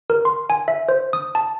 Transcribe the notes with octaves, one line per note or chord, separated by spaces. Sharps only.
A#4
C6
G#5
E5
C5
D#6
A5